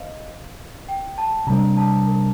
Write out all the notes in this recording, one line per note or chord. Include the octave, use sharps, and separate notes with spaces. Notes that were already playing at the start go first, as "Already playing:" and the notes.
Already playing: C5 D#5 F5
G5
A5
C3 G3 D4 A#5
A5
A#4